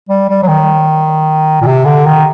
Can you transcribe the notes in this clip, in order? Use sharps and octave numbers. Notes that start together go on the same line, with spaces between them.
G3
G3
F#3
D#3
A#2
C3
D3
D#3